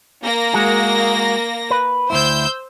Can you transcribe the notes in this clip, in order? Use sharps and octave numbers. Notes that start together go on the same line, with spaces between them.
A#3 A#6
G#3 F#4 G#4
B4
D2 G#2 E4 C5 E6 G6